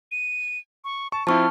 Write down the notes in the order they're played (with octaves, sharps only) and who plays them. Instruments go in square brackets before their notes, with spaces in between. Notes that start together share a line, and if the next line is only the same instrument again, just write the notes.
[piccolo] D#7
C#6
[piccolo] A5 [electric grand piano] C#6
[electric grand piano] F3 C4 E4 [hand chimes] A5 C#6 [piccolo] F6